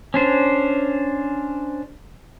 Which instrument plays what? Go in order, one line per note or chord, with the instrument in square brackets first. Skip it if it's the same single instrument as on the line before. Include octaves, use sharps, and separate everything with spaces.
[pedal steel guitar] C#4 D4 C5